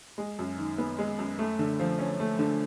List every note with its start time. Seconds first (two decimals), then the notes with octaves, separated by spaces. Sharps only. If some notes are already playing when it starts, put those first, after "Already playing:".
0.18 G#3
0.39 F#2
0.58 D#3
0.78 B3
0.98 G#3
1.19 F#2
1.39 A3
1.59 D3
1.80 F3
1.99 C#4
2.20 A3
2.39 D3